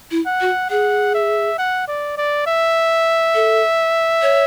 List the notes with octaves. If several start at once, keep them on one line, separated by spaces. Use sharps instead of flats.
E4
F#5
F#4
G#4 F#5
E5
F#5
D5
D5
E5
A4
C#5